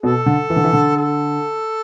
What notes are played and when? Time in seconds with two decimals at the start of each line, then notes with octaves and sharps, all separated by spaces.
0.02 B2 A4
0.26 D3
0.50 E3
0.56 D3
0.64 E3
0.73 D3
0.96 A4